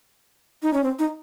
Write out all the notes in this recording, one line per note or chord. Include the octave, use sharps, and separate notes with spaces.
D#4
C#4
C4
D#4